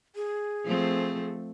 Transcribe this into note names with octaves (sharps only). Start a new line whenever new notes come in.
G#4
F3 A3 C4